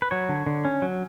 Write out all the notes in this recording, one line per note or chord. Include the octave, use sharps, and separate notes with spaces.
B4
F#3 C#5
D3
D3
C#4
F#3